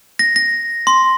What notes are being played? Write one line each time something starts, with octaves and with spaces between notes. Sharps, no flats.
A#6
A#6
C6